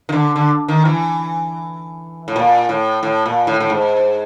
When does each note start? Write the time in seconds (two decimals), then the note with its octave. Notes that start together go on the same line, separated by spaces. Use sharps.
0.09 D#3
0.12 D3
0.36 D3
0.68 D#3
0.85 E3
2.28 A2
2.36 A#2
2.69 A2
3.03 A2
3.26 A#2
3.47 A2
3.60 A2
3.70 G#2